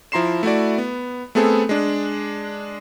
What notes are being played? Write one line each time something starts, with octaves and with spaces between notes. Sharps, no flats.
F3 E4 A#5 C6 C7 E7
A3 E4 F#4 D5
B3
A3 B3 C4 G#4 A4
G#3 D4